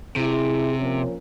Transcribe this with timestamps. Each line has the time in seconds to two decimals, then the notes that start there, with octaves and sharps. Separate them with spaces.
0.16 C3 E4 G#4
0.79 A#2 F3 C#4